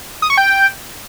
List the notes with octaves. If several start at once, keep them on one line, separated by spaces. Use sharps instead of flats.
D#6
C#6
G5